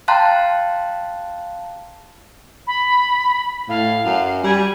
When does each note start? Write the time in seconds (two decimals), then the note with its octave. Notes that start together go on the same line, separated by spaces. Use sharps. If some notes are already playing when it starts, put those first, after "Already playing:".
0.08 F5 G5 A5 A#5 C6 F#6
2.67 B5
3.68 A2 F5
4.05 F#2
4.44 G3 G#5